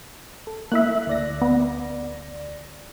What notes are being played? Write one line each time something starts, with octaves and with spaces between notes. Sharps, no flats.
A4
A#3 E4 E5 F#6
D2 D5 A#6
B3